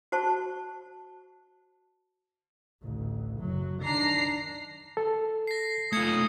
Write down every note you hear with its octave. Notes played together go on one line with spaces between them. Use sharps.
F#4 C5 A5 C#6
A1 D2
F#1 F#3
D#3 D4 A#5 C7
A4
A#6 C7
A3 F4 D#6 G#6 C#7